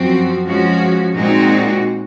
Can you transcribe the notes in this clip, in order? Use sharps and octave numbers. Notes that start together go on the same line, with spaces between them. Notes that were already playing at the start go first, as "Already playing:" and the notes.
Already playing: F#2 F3 C4 F#4
F3 G#3 C#4 F#4
A#2 G#3 C4 D#4 F#4